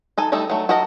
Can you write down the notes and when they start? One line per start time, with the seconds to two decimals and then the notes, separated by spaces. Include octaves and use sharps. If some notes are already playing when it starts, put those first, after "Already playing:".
0.18 D#4 A4 G#5
0.32 G3 A3 D#4 A4
0.50 F#3 A3
0.69 F#4 A4 A#4 D#5 A#5